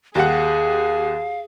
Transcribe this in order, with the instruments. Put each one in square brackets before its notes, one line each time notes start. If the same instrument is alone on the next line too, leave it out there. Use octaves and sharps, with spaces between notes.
[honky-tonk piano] D#2 G4 F#5 [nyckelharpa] G#4 [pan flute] F5